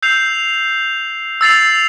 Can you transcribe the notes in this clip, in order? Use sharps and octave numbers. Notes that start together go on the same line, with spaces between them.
E6 G6 C7 F7
E6 A6 C7 F7